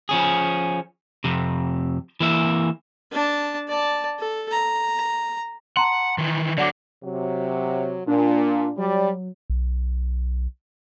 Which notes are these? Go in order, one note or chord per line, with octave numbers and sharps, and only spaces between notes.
F3 C#4 G#4
F2 C3
E3 A#3 E5
D4 A5
D5 A5
A4
A#5
F#5 A5 A#5 C6
D#3 E3
D3 F#3 D5 F#5 D6
C3 F#3
A#2 D4
F#3 G3 D5
B1